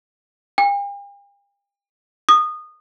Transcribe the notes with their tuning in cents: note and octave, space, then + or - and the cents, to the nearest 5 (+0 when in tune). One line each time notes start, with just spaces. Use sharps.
G5 +45
D#6 -20